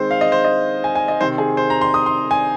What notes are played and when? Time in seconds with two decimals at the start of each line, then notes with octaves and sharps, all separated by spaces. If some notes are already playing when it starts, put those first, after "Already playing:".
Already playing: D#3 G#3 C4 C5
0.11 F5
0.21 D#5
0.32 C5
0.45 D#5
0.84 G#5
0.95 G#5
1.08 D#5
1.20 C3 D#3 C4 C5
1.38 G#4
1.57 C5
1.70 A#5
1.81 C6
1.94 D#6
2.06 C6
2.31 G#5